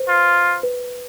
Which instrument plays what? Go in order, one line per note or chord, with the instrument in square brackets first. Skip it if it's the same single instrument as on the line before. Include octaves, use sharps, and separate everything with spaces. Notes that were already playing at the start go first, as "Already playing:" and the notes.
Already playing: [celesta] B4 C5
[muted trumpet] F4
[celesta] B4